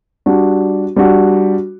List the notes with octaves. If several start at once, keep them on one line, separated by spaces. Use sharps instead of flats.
G3 D4 F#4
G3 D4 F#4